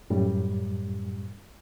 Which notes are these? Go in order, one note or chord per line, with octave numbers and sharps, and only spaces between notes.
F#2 A2 G3